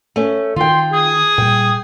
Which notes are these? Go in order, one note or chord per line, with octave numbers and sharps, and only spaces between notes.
A3 C#4
D#3 F4 G5 C6
G#4 D#6
A#2 G3 G5